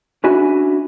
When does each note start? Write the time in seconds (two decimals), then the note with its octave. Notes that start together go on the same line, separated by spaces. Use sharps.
0.24 C#4 D4 F#4 E5 G#5 B5